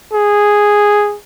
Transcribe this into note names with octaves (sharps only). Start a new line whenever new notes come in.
G#4